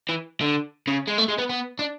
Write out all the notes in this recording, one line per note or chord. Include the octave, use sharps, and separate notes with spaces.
E3
D3
C#3
G#3
A3
G#3
B3
B3
D4